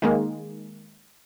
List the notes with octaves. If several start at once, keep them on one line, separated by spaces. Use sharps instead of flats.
D#3 G#3 A#3